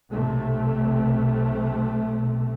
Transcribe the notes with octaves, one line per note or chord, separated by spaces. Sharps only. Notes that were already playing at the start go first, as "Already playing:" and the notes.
B1 C3 A3